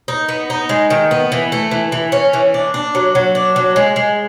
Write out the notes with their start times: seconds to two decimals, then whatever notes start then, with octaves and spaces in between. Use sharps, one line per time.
0.08 D#4
0.29 B3
0.50 D#4
0.69 G#3
0.90 D#3
1.11 B3
1.32 E3
1.52 A3
1.71 E3
1.92 E3
2.12 C#4
2.33 E3
2.54 D4
2.74 D4
2.95 F#3
3.15 F#3
3.35 D4
3.56 F#3
3.76 G#3
3.96 G#3